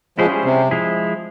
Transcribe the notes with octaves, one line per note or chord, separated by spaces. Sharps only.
F3 G3 G#3 C#4 E4 G#4 C5
C3
F3 G#3 E4 G#4